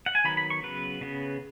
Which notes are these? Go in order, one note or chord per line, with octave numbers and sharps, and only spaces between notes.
F#5
G#5
D#3 F#3 B3 B5
B5
C#6
C#3 F#3 B3 B4
C#3 B3